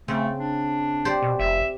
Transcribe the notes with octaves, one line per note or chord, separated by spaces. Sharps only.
C#3 A3 C4
D4
G4 C5 D5
B2
F1 E5